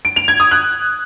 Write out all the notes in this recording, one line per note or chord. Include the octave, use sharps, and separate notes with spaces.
D7
F7
G#6
D#6
F#6